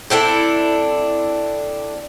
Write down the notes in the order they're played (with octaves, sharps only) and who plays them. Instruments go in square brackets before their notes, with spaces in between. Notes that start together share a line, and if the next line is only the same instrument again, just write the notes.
[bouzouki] C4 D4 E4 A4